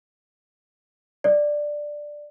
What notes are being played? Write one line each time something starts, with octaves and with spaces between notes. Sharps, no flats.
D5